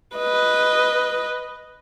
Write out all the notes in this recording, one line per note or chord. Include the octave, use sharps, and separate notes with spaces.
B4 D#5